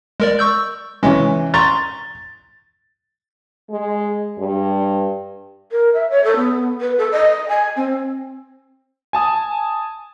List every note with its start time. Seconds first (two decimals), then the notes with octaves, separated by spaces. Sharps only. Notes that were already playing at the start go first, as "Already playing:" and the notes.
0.20 G#3 A#4 D5
0.39 C#6 E6 G6
1.03 C3 E3 G#3 C#4
1.54 A#5 C6 C#6 A6
3.70 G#3
4.38 G2
5.72 A#4
5.94 E5
6.10 C#5
6.24 A4
6.36 B3
6.81 B4
6.98 A4
7.12 D#5
7.49 G#5
7.76 C4
9.13 G#5 A5 D#6